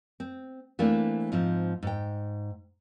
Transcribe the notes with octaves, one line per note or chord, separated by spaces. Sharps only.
C4
E3 A3 A#3 C4 D4 E4
G#2 F3 C4
G#2 G5